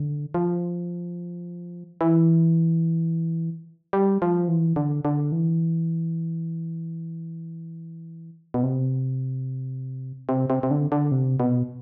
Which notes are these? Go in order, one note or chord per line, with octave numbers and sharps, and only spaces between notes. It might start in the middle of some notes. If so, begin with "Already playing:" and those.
Already playing: D3
F3
E3
G3
F3
E3
D3
D3
E3
B2
C3
C3
C3
C3
D3
D3
C3
B2